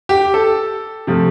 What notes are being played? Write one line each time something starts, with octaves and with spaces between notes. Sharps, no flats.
G4
A4
C3 F3 A3